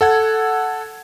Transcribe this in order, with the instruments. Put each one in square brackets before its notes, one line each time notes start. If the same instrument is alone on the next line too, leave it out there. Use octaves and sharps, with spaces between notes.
[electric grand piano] A4 F#5 G#6